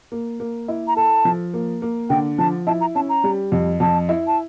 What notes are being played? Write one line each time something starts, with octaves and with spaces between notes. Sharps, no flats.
A#3
A#3
E4
A#5
A4 A5
F3
A#3
A#3
D3 G5
F3 A5
E4 A5
A#5
C#4 A5
A#5
G3
F2
F2 A5
E4
A5